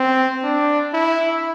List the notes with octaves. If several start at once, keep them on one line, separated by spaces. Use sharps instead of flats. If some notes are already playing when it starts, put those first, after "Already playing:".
Already playing: C4
D4
E4